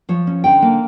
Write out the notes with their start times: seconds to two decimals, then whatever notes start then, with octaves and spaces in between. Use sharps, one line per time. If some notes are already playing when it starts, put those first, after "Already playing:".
0.09 F3 C#5
0.27 C#4
0.44 D3 G5
0.62 A#3